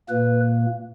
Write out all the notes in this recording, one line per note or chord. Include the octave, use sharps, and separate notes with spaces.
A#2 A#3 B4